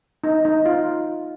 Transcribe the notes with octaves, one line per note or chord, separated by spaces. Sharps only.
D#4
D#4
F4